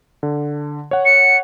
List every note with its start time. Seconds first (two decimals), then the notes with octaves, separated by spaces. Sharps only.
0.23 D3
0.91 C#5 F#5
1.05 C#7